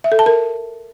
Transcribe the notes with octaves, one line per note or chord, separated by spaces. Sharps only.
E5
A4
A5
A#4